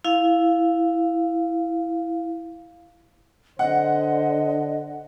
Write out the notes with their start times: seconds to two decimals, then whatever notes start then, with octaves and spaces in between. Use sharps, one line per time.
0.05 E4 F5
3.59 D3 C5 D#5 F#5